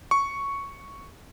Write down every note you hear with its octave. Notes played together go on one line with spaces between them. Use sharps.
C#6